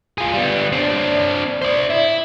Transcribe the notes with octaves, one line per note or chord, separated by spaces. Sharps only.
F4 G#4
G3 B3
C4 D4
C5 D5
E4